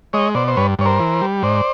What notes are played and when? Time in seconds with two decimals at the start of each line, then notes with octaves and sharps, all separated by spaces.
0.13 G#3 C#5 D#5
0.35 B2 C5 D5
0.48 C5
0.56 G2 B4 C#5
0.79 G2 C#5
0.85 A#4 C5
1.00 E3
1.21 G3
1.43 G#2 C5 D5